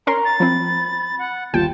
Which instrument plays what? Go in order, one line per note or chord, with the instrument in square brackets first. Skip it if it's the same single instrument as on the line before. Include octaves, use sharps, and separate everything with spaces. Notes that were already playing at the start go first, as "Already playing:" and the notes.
[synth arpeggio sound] C#4 A#4 C6 [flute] A#5
[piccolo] A6
[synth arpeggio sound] F3 C4 [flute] B5
[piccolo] F#5
[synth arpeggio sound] G1 D#2 G5 [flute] F4 [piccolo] A5